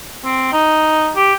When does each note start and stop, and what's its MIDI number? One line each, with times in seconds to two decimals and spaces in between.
0.25 0.51 60
0.53 1.10 63
1.16 1.33 67